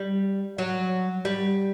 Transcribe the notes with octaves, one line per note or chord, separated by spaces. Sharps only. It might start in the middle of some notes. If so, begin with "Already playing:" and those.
Already playing: G3
F#3
G3